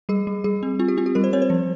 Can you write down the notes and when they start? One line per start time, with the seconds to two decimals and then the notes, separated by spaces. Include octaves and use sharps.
0.09 G3 G#4
0.27 G3
0.44 G3 G#4
0.63 C4
0.79 C4 F4
0.88 G4
0.97 C4 F4
1.06 G4
1.15 G3 A#4
1.24 C5
1.33 C4 C#5
1.42 C5
1.50 F3